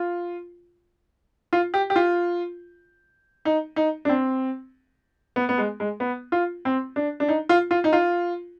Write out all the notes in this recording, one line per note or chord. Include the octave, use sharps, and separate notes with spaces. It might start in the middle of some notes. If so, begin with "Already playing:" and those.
Already playing: F4
F4
G4
G4
F4
D#4
D#4
D4
C4
B3
B3
G#3
G#3
B3
F4
C4
D4
D4
D#4
F4
F4
D#4
F4